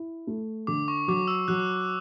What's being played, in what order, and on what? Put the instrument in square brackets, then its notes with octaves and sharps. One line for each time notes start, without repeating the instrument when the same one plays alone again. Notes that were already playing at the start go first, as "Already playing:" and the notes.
Already playing: [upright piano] E4
A3
[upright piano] D3 [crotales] D6
[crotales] C#6
[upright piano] F#3 [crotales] D6
[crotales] E6
[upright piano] F#3 [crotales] F#6